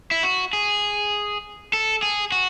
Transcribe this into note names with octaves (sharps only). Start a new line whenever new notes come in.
E4
F#4
G#4
A4
G#4
F#4